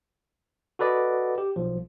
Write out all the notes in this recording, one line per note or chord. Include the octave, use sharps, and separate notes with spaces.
F#4 A4 B4 D5 D#5 F#5
G4
B1 F3